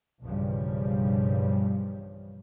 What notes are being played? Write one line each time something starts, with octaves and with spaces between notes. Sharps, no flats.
B1 E2 G2 C#3 F3 G3